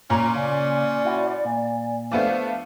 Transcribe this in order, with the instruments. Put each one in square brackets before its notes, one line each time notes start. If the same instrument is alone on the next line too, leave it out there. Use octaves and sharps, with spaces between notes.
[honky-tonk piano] A#2 [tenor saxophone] C#4 [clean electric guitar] C#5 A#5
[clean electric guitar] C#3 [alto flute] D5
[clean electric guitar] E4 F#4
A#2
[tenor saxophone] F3 [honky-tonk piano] A3 B3 D4 [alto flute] F5